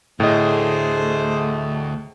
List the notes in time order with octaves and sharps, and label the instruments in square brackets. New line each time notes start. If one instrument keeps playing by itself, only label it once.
[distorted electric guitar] D2 [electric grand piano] A2 D#5 [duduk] A3 [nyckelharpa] G#4 C5